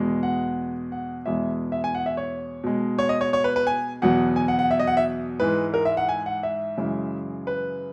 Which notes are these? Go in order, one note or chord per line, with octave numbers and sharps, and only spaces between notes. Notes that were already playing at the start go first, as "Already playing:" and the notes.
Already playing: E2 B2 G#3
F#5
F#5
E2 B2 G#3 E5
E5
G#5
F#5
E5
C#5
B2 G#3
C#5
D#5
C#5
C#5
B4
B4
G#5
E2 B2 F#3 F#5
G#5
F#5
F#5
E5
D#5
F#5
E5
G#2 E3 G#3 B4
A#4
E5
F#5
G#5
F#5
E5
F#2 C#3 E3 G#3
B4